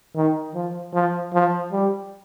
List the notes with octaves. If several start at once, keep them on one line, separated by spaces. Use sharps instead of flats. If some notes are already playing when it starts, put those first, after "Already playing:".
D#3
F3
F3
F3
G3